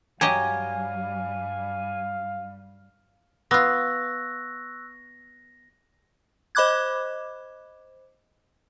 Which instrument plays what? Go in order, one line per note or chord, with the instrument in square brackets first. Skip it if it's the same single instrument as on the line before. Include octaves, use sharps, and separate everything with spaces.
[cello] G2 G3 [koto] F#3 G4 D#5 [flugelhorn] F5 [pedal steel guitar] G#5
[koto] B3 F4 [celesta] C#6 E6 F#6 [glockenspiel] A#6
[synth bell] C5 D#5 B5 D6 F#6 G#6